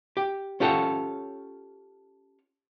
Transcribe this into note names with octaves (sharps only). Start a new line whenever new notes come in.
G4
C#4 F4 G4 A4 C#5 F#5